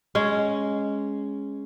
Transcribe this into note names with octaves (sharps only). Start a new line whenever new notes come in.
G#3 C#4